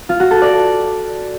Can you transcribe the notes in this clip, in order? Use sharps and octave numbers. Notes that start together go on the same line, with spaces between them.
F4
F#4
A4
D5